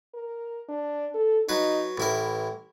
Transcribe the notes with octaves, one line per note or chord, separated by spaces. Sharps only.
A#4
D4
A4
F#3 D#4 B4
A1 E3 E4 A#4